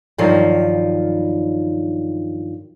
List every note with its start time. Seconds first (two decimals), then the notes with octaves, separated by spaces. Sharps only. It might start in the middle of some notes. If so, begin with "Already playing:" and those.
0.18 G2 D#3 F3 F#3